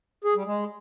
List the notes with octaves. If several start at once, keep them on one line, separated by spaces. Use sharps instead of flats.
G#4
G3
G#3